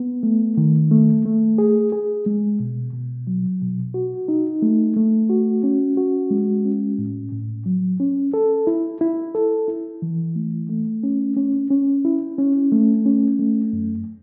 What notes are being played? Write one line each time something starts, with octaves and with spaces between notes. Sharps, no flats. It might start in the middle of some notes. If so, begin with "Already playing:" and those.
Already playing: B3
A3
D#3
A3
A3
G#4
G#4
G#3
B2
B2
F#3
B2
F#4
D#4
A3
A3
F#4
C#4
F#4
G#3
C#4
A2
A2
F#3
C#4
A4
E4
E4
A4
E4
E3
A3
A3
C#4
C#4
C#4
E4
C#4
A3
C#4
A3
F#2